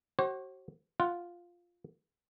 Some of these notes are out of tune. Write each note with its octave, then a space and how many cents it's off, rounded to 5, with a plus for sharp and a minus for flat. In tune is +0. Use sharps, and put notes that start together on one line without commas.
F#4 +35 C5 +45
F4 +0 F#5 +0